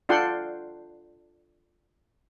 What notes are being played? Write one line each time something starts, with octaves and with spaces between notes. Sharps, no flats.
D4 F4 A4 F#5 G5 C6